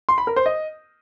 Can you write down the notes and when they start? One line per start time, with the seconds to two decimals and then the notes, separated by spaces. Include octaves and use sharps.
0.09 C6
0.18 B5
0.27 A#4
0.36 C5
0.46 D#5